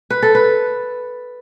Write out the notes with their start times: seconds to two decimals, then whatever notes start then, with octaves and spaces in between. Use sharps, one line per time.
0.10 B4
0.22 A4
0.35 B4